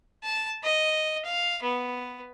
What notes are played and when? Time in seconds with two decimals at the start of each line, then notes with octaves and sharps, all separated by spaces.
0.24 A5
0.64 D#5
1.25 F5
1.63 B3